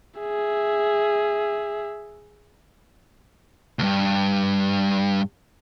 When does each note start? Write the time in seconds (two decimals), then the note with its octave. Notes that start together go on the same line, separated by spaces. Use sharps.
0.19 G#4 E5
3.79 D2 G2